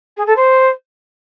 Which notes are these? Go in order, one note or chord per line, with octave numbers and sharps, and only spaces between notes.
G#4
A4
C5